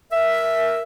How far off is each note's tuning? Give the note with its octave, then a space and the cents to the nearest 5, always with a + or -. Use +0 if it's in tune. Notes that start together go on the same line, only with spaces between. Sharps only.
A#4 +5 E5 +0